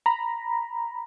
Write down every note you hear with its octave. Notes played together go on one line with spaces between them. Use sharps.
A#5 B5